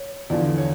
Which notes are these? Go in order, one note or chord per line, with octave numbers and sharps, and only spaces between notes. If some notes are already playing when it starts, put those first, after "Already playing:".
Already playing: C#5
E2 D3 F3 D5
C#5